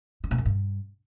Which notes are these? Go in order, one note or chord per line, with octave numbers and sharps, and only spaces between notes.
D3
A2
F#2
G2